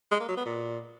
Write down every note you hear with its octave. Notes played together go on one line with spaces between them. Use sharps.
G#3
A#3
F#3
B3
A#2